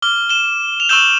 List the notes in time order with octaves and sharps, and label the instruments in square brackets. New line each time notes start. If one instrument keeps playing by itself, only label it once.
[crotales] D6 F6 G7
E7 G7
F7
C#6 E6 G6 E7 G7